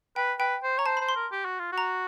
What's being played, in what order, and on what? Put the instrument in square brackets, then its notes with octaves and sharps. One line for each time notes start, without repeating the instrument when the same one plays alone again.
[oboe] B4 [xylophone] G5
[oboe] B4 [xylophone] G5
[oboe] C5
[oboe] C#5 [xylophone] A#5
[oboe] C5 [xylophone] A5
[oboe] C5 [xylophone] B5
[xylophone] C6
[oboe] A#4
G4
F#4
F4
F#4
[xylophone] A#5